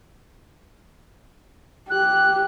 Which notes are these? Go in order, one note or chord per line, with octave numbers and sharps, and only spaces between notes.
G4 F#6